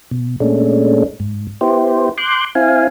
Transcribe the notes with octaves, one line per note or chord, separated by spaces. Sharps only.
B2
A#2 G#3 A3 C#4 D4
G#2
B3 E4 G4 C5
C6 D6 F#6 G6
C4 E4 F5 G#5